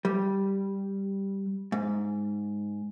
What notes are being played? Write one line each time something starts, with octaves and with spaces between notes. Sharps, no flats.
G3
G#2